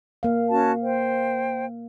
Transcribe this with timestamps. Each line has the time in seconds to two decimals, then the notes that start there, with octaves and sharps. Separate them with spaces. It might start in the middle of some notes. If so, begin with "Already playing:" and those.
0.23 A#3 F5
0.49 C#4 F#4 A5
0.82 C5 G5